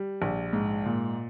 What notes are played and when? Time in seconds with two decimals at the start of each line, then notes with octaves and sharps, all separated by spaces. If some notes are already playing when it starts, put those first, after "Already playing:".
Already playing: G3
0.22 A#1
0.53 G#2
0.85 A#2